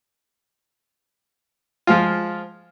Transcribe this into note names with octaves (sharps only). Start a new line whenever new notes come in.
F3 G#3 F4